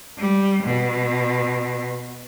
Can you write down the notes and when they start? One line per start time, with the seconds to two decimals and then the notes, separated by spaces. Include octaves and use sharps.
0.18 G3
0.64 B2